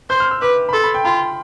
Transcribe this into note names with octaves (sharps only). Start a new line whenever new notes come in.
C5 G6
F6
E6
B4 D6
B5
A4 C6
B5
G5
F4 B5